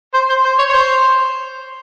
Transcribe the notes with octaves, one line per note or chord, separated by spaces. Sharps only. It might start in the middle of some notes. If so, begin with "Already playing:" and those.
C5
C5
C5
C#5
C#5
C5